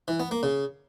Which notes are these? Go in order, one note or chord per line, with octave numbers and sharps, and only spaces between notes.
E3
B3
A#3
C#3